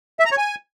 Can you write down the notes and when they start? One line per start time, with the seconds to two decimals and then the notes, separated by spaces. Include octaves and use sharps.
0.20 E5
0.26 A#5
0.32 C#5
0.38 G#5